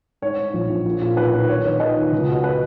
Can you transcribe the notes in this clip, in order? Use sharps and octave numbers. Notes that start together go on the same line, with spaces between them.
G#2 C#5
G#2
A#1
A#1
A#2
A#2
B1 B4
A#2 B4
D#2 C#5
D#3 C#5
D#2 B4 D#5
D#2
C#2
B2
B2 B4